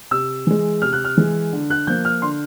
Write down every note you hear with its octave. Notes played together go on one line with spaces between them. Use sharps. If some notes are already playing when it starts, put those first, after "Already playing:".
C3 E6
E3 G#3
C3 F6
F#6
F6
E3 G#3
D3
F#6
F3 A#3 G6
F6
D3 C6